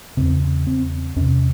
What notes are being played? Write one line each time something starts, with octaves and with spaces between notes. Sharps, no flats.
E2 C#3 C4
C4
E2 C3 C#4